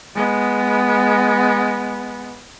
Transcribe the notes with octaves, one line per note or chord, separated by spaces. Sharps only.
G#3 B3